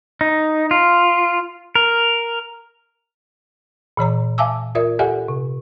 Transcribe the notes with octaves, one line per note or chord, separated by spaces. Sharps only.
D#4
F4
A#4
A#2 E3 C#5 A#5
E5 F5 G#5 A5 D6 E6
F4 A#4 D5 E5
G4 A4 D5 E5 F#5 G#5
C3